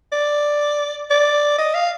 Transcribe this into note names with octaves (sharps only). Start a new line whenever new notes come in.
D5
D5
D#5
F5